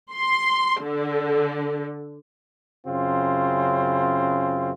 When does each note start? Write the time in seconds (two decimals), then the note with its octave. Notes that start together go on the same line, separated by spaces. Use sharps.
0.12 C6
0.83 D3
2.87 F#2 C#3 C4 F4